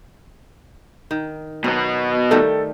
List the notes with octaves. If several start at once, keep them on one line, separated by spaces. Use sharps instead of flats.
D#3
B2 F#3 B3
D#3 G3 A3 A4